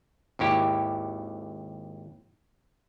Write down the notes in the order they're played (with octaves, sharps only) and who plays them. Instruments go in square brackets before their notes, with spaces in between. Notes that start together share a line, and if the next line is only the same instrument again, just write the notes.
[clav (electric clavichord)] G#1 D#2 E4 G4